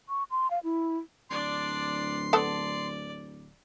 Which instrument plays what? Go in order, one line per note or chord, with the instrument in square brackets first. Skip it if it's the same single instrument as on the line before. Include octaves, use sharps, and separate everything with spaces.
[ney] C#6
C6
F5
E4
[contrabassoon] D1 [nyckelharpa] D4 D5 [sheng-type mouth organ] C6
[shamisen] B3 A4 A5 [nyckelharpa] D5